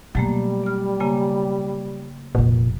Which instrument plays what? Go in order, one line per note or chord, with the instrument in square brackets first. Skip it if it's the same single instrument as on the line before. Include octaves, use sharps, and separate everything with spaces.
[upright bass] B2 [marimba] F#3 A3 A#3 [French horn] G3
[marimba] D5 F6
C#3 A#3 G#5
[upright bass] F1 F2 [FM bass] A#2